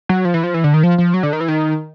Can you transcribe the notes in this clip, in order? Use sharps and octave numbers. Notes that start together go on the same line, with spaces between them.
F#3
F3
E3
F3
E3
D3
D#3
F3
F3
F#3
D3
D#3
E3
D#3